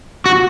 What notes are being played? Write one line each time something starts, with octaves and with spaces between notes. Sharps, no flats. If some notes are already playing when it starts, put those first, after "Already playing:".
F#4